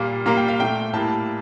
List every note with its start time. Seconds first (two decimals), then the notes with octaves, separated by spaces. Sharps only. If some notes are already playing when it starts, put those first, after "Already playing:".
Already playing: A#2 G3 A#3
0.26 A#2 G3 A#3 A#5
0.37 G5
0.48 F5
0.60 A#2 A3 G5
0.93 A2 G3 A#3 A5